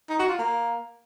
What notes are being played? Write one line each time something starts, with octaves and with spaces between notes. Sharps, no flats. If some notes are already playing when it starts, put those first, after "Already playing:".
D#4
F#4
F4
A#3